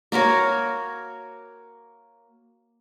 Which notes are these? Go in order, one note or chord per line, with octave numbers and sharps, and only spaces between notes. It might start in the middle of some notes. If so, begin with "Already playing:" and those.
A#3 F#4 A#4 C#5